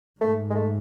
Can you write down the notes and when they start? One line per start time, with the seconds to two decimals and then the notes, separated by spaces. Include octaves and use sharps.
0.20 G#2 A3
0.50 G#3
0.55 A3